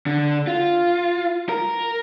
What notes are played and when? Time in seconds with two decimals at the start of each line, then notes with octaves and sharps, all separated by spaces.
0.06 D3
0.47 F4
1.49 A#4